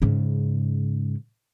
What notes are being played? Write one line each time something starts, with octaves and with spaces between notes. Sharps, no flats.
G#2 C#3